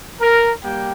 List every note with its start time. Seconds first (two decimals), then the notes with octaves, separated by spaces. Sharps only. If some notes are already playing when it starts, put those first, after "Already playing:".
0.20 A#4
0.63 G3 A#3 G4 G5